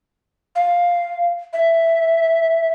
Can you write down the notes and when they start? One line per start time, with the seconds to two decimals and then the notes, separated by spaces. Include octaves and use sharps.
0.56 F5
1.53 E5